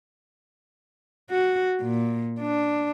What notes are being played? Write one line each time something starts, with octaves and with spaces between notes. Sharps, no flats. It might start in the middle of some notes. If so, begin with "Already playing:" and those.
F#4
A#2
D4